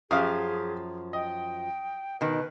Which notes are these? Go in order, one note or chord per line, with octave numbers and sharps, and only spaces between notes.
F#2 F3 G4 G#4 F5 D#6
D#5 G5
B2 D#3 B4